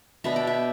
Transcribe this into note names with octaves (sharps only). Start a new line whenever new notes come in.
B2 B3 D4 E5
G5
E5